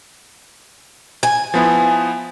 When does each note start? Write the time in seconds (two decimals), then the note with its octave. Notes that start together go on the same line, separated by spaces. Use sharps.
1.23 G#5
1.54 F3 B3 E4